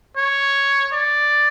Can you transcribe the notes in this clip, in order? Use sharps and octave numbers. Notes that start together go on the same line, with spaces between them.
C#5
D5